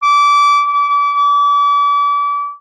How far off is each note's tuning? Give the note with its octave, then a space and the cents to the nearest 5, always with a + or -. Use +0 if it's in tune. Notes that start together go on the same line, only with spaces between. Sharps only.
D6 -25
D6 -35